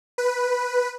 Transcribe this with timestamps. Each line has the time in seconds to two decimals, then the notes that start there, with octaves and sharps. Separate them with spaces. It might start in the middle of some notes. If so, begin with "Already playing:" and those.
0.18 B4